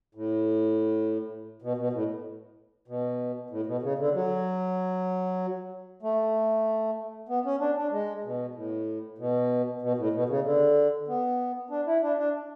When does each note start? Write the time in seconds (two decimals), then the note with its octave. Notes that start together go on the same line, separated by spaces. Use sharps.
0.15 A2
1.62 B2
1.78 B2
1.93 A2
2.88 B2
3.50 A2
3.66 B2
3.82 C#3
3.98 D3
4.14 F#3
6.02 A3
7.29 B3
7.45 C#4
7.60 D4
7.76 D4
7.91 G#3
8.24 B2
8.54 A2
9.18 B2
9.82 B2
9.97 A2
10.13 B2
10.29 C#3
10.44 D3
11.08 B3
11.70 D4
11.86 E4
12.01 D4
12.18 D4